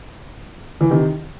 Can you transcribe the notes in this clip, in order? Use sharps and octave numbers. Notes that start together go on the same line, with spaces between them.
E3
C3 D#3